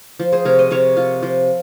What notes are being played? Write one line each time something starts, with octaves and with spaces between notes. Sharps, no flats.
F3
G#4 C5
C3 A#4 C#5
C5 D#5
C3 A#4 C#5
F4
F3